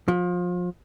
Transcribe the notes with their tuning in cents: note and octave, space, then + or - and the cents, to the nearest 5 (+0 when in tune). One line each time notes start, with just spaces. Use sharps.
F3 +30